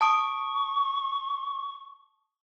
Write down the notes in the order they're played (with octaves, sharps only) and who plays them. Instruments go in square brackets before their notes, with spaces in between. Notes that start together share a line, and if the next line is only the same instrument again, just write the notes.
[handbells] A5 D#6 D7 [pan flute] C#6